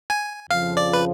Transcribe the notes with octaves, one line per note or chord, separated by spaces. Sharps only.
G#5
F2 C#3 F3 F5
D5
B4